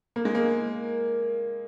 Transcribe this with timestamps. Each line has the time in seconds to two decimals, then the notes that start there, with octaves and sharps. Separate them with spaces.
0.16 A#3
0.25 G#3
0.35 A#3